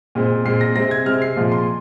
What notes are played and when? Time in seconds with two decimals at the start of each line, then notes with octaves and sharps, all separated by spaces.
0.15 A#2 G#3 C4
0.45 A#2 G#3 C4 C7
0.61 A#6
0.75 C3 G#3 C4 A#6
0.91 G#6
1.06 C3 G#3 C4 F6
1.22 C7
1.36 A#2 F3 G#3
1.52 C6